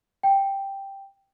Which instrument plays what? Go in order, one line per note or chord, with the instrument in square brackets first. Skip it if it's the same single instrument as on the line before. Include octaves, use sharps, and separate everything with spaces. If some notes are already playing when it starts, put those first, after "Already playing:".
[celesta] G5